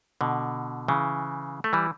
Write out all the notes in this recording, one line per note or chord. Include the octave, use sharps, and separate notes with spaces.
B2 D3
C#3 E3
A3
E3 G3